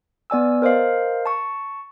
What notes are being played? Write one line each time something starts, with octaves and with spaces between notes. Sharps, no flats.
B3 D5 G#5 E6
A#4 C5 D#5 F5
A5 C#6